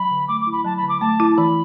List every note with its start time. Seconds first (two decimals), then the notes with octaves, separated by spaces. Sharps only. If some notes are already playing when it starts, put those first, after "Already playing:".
Already playing: F#3 B5
0.11 D3
0.28 A3 D6
0.41 D6
0.47 E4
0.52 B5
0.65 F#3 A5
0.77 B5
0.83 D3
0.89 D6
1.01 A3 A5
1.20 E4
1.31 A5
1.37 E3 B5